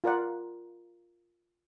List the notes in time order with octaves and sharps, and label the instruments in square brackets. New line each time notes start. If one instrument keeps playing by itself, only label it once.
[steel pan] F4 A#4 D5 F#5